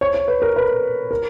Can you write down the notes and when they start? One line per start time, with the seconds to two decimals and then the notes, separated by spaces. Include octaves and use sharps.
0.01 C#5
0.14 C#5
0.28 B4
0.42 A#4
0.56 B4
1.11 A#4